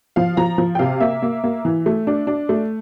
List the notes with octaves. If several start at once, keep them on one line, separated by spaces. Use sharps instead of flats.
F3 F5
F3 A#5
F3
G5
C3 F5
A#3 E5
A#3
A#3
E3
A3
D4
D4
A3